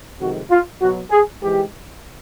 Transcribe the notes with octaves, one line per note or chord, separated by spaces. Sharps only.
F2 C3 D#3 G#3 F#4
F4
B2 F#3 F#4
G#4
G#2 E3 G#3 G4